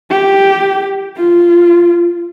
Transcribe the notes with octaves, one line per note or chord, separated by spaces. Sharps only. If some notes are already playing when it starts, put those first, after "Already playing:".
G4
F4